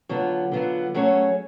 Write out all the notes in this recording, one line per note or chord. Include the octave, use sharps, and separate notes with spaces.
D3 F#3 B3 F4
D3 F#3 B3 F4
F#3 A3 C#4 G#4 C#5